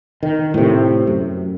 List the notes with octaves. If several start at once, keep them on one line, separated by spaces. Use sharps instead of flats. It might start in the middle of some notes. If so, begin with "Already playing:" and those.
D#3
A2 C3
F#2